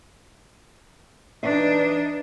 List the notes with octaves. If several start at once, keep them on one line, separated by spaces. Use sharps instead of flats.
E3 D4 D#4 B4 E5